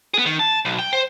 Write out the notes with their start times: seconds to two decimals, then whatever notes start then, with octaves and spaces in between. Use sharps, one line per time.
0.14 B3 G#4
0.26 D#3
0.39 A5
0.65 B1
0.79 G5
0.93 C5